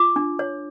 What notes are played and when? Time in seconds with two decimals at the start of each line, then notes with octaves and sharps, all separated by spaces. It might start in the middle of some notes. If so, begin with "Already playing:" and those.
Already playing: F4 D6
0.16 D4
0.39 C#5